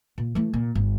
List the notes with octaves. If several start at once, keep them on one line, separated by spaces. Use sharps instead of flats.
A#2
E3 A3
A#2
G1